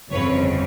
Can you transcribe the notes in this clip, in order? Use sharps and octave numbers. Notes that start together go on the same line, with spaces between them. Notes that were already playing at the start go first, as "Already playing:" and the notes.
G1 F2 C#3 B4 C#5